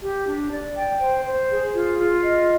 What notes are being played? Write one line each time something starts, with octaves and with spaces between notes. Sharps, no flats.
G4
D4
D5
G5
C5
C5
G#4
F4
F4
D#5